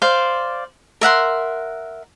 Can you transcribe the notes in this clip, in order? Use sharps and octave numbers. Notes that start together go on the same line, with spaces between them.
C5 D5 F5
A#4 E5 F#5 C6